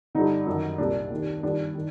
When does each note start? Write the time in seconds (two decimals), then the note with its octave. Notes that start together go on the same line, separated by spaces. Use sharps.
0.15 G2 D3 D#4
0.46 F#2 D#3
0.78 C2 A#2 D4
1.10 D#2 D#3
1.43 G2 D#3 D4
1.75 D#3